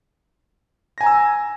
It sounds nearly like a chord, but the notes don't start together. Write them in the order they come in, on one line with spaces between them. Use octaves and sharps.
A#6 G#5 A#5 E6